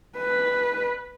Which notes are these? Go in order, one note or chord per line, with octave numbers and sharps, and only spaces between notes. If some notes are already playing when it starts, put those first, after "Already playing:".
B4